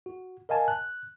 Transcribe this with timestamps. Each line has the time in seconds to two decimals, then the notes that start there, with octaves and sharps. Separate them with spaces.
0.06 F#4
0.49 A#4 D#5 F5 G#5 A5
0.68 F#6